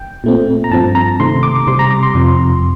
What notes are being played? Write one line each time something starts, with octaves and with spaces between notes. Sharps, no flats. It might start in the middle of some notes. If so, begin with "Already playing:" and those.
Already playing: G5
A#2 A3 C4
A#5
G2 F3 C4 A5
A#5
C3 D#3 A3 C4 C6
D6
C3 G3 C4 C6
A#5
D6
C6
F2 C3 F3 C4